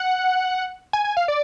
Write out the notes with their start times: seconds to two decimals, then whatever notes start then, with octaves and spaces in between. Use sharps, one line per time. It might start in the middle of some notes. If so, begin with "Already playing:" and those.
Already playing: F#5
0.93 G#5
1.04 G#5
1.17 F5
1.28 D5